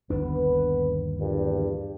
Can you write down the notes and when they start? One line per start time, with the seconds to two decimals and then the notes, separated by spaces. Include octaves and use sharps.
0.10 G1 D#2 B3 D4 B4
1.19 E2 G2 A#2